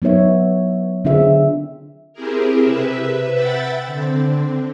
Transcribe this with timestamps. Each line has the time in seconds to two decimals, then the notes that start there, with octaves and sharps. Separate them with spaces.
0.02 F#3 B3 D#4 C#5 E5
1.05 D3 C4 D4 F4 G#4 E5
2.13 C4 E4 G4 G#4 A#4
2.61 C3 B4 E5
3.31 E5 F#5 G5 B5 A6
3.86 D3 C4